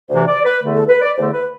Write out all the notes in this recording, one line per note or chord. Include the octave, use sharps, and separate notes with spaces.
D2 C3 E3 C5
D5
B4
E2 D3 A3
A4
B4
D5
E2 D3 A3 C5
B4